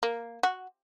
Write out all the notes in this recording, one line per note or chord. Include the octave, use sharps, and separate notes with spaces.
A#3
F#4